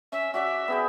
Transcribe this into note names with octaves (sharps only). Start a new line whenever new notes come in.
C#4 E5
F#4 D5 E5
B3 G#4 G5